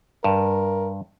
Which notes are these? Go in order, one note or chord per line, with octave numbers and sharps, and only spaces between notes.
G2 A#4